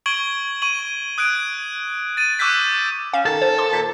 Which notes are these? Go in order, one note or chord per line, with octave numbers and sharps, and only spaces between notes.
C#6 G#6 D7 F#7 G7
C#6 D#7 F#7
D#6 F#6 G#6 D7
A6 D#7
C#6 D6 E6 F#6 G6 B6
C#4 F5 E7
D#3 A4
C5
C6 D6
A#2